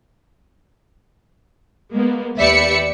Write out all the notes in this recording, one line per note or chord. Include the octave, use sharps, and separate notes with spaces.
G#3 A#3 B3
D#2 G4 B4 D5 E5 C#7